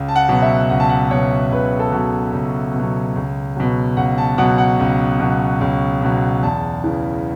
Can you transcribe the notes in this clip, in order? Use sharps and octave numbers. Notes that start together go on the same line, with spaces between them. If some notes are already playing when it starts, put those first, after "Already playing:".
Already playing: C#2
A5
F#5
B2 F#3
E5
C#2 F#5
A5
F#5
B2 F#3 C#5
C#2 B4
A4
B2 F#3
C#2
B2
F#3
C#2
B2 F#3
C#2 F#5
A5
B2 F#3 F#5
F#5
C#2
B2 F#3
C#2
B2 F#3
E2 A5
C#3 E3